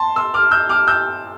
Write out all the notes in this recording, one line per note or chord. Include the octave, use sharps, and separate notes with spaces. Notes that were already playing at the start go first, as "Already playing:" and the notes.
Already playing: A5 C6
C6 E6
D6 F6
E6 G6
D6 F6
E6 G6